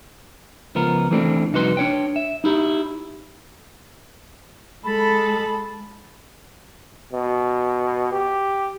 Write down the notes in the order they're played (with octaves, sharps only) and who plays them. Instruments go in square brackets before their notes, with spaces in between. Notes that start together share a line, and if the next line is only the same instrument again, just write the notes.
[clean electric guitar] C#2 F3 B3 A#4
E3 A3 C4 D4
C2 F2 D#4 F#4 B4 C6
D4 C#5 G5
E5
D#4 E4 G4
[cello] G#3 A4 [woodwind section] A5 B5
[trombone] B2
G4